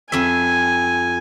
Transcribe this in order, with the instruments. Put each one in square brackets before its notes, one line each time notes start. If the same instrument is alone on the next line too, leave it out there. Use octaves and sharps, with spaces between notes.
[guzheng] F2 E5 [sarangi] G#5